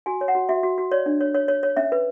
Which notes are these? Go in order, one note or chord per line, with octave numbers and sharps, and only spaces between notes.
F#4 G#5
C#5
F#5
F#4
F#4 E5
F#4
F#4
C#5 D5
D4
C#5
C#5
C#5
C#5
C#4 E5
B4